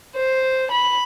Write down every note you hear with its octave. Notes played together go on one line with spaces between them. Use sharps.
C5
B5